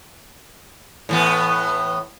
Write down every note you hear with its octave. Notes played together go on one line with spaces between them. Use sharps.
A2 E3 B3